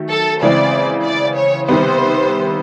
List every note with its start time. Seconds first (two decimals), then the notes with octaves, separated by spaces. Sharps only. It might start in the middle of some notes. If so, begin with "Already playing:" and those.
Already playing: D#3 F#3 A3
0.10 A4
0.42 C#3 E3 G#3 C4 D5
1.05 D5
1.36 C#5
1.68 C3 D#3 G3 B3 C5